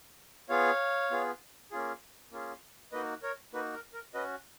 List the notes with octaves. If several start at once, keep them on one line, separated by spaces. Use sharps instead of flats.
B3 F4 G#4 C#5 F5
B3 F4 G#4
A#3 C#4 F4 G#4
A#3 C#4 F4 G#4
A#3 D#4 F#4 B4 D#5
A#4 C#5
A#3 D#4 F#4 B4
A#4
A#4
C#4 F#4 B4 D#5